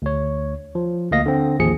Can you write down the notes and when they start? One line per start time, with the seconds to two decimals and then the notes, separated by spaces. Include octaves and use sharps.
0.02 D2 C#5
0.75 F3
1.12 D2 A#3 D#5 F5 A#6
1.26 D3 C4
1.59 A1 D#2 F3 G#4 C#7